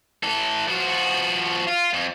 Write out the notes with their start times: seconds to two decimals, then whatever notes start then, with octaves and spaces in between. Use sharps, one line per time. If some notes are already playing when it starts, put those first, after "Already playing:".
0.23 E3 A4
0.68 F3 F#4
1.67 F4
1.94 F2